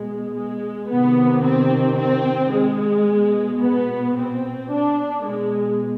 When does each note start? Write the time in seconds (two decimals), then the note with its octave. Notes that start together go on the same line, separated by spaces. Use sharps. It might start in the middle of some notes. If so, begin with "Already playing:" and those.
Already playing: B2 G#3
0.35 G#3
0.89 C3 D#3 B3
1.43 C4
1.98 C4
2.53 G#3
3.08 B2
3.61 B3
4.16 C4
4.71 D4
5.25 B2 G#3